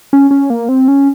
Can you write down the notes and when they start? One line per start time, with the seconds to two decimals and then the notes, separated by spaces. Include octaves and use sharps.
0.13 C#4
0.31 C#4
0.50 A#3
0.69 C4
0.88 C#4